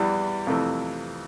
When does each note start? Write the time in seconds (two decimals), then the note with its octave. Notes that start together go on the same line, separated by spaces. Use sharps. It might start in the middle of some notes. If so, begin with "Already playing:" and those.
Already playing: E2 E3 G3
0.47 F2 C3 E3 A3